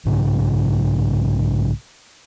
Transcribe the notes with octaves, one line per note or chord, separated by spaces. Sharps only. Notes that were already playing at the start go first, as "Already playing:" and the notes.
B1 G#2 C#3